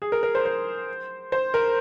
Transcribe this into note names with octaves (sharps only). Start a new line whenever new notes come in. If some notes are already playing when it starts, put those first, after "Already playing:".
G#4
A#4
A#4
C5
C5
C5
A#4